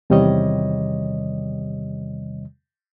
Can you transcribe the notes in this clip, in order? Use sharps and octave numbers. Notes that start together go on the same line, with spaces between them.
E2 C3 D#3 G3 C#5 D#5